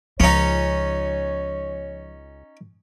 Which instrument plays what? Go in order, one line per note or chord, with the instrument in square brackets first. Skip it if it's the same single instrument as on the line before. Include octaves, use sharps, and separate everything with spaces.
[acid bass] C#2 [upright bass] F3 [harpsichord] C#4 D#4 [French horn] C#5